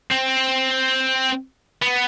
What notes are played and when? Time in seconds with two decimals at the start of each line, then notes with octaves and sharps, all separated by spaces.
0.12 C4
1.82 B3